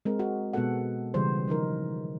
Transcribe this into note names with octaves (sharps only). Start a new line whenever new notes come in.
G#3 C4 A#4
F#4
B2 G#3 B3 F#4 A4 F#5
C#3 E3 G3 C5
D#3 F3 D#4 A#4